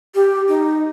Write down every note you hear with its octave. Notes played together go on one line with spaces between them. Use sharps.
G4
D#4